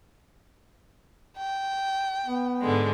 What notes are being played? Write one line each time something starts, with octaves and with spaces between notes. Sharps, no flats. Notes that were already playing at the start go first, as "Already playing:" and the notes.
G5
B3
G#2 D3 G#3